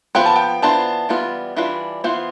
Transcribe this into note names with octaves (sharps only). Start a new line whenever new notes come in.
F3 B3 F4 B4 G5
A5
G5
E3 B3 D4 F4 C5 A5
E3 G3 B3 F4
E3 G3 D4 F4 B4
E3 B3 F4 C5